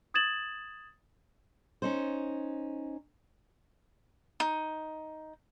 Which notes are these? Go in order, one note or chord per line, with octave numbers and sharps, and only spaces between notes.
D#6 G#6 A6 E7 F#7
C#4 D#4 C5
D#4